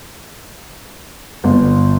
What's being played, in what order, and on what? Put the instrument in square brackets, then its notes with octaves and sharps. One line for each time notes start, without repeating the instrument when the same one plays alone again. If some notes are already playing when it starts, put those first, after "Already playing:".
[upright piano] G1